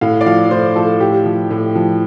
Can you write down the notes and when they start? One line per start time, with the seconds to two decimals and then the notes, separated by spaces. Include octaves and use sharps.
0.01 A2 F5
0.21 D5
0.26 F3 F5
0.51 A2 C5
0.76 F3 A4
1.00 A2 G4
1.25 F3
1.51 A2
1.75 F3